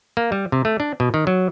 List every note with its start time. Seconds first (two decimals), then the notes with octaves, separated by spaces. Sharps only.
0.17 A#3
0.32 G3
0.52 C3
0.65 A3
0.80 D4
1.00 B2
1.14 D#3
1.27 F#3